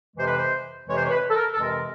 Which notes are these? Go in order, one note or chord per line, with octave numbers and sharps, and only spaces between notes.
F2 C3 E3 G#3 C5
B4
C5
F2 C3 E3 G#3 C#5
C5
C#5
B4
A4
A#4
A4
F2 C3 E3 G#3 A#4